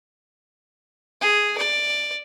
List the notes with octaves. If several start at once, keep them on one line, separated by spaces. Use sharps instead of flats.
G#4
D5